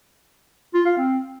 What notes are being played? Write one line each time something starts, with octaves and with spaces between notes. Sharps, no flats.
F4
F5
C4